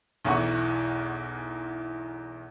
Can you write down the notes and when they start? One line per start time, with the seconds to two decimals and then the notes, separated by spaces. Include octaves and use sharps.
0.25 B1 E2 E3 F#5 C#6